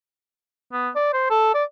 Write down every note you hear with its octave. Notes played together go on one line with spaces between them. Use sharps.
B3
D5
C5
A4
D5